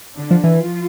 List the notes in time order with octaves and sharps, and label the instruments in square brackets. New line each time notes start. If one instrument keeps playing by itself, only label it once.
[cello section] D3 D4
[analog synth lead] F3
E3
[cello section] F3 F4